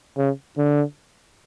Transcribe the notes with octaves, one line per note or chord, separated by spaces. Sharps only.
C#3
D3